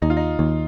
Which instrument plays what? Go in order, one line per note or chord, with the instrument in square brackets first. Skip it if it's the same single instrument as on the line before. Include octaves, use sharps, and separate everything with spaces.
[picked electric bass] D#2 [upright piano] D#4
[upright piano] F4
D#4
[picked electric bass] D#2